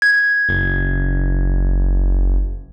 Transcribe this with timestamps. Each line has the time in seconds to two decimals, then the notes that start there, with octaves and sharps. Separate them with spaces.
0.02 G#6
0.48 F#1